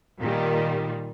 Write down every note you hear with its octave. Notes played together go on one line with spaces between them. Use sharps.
A#2 D#3 G3